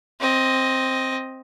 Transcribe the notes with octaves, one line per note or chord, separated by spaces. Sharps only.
C4 D#5